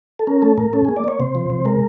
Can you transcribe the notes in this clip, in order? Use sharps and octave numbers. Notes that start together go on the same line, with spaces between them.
A4
C#4 A#4
A3 A4
A2 A#4
C#4 A4
A#3 G#4
D5
A#3 C#5
C3 C5
F3
C3
G#3 A#4